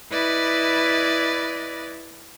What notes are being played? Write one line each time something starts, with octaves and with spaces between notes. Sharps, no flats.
E4 B4 D5 D#5